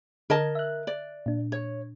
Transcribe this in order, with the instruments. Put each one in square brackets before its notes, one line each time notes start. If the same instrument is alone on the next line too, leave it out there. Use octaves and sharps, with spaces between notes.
[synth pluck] D3 G#6 [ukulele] A#4 D#5 A5
[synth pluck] E5 F#6
[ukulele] D5
[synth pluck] A#2 D4
[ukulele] C#5